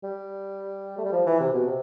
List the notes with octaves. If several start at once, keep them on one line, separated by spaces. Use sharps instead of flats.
G3
A3
G3
F3
E3
C3
B2
C3